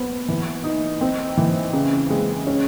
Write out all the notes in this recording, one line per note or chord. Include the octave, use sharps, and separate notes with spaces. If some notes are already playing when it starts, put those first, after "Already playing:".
Already playing: B3 C5
E3
D#4
C4
E3
C#3
G#3
C#4